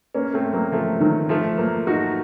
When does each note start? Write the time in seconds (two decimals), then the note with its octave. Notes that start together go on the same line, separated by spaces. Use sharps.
0.15 A#3 C#4
0.34 A3 C4
0.53 F#3 A#3
0.72 F3 A3
1.01 D#3 F#3
1.29 F3 A3
1.58 F#3 A#3
1.87 D#4 F#4